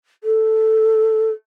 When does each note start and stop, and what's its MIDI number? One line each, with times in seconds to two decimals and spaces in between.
0.23 1.30 69